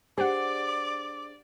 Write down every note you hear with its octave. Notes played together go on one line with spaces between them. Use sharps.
D4 G4 G#4 C5 D5 F#5 D6